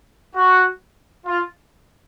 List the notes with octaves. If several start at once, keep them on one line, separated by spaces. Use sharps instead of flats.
F#4
F4